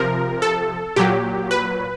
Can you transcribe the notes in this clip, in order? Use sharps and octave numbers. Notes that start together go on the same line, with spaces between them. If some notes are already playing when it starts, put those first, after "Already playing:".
Already playing: C3 F3 A#4
A4
A#2 F#3 G4
B4